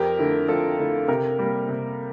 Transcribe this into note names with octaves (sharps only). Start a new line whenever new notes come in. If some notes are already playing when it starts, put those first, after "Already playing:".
Already playing: F2 G4 A#4
D3 A3 E4
F2 F4 A4
D3 A3 E4
C3 G4 A#4
G3 A#3
C3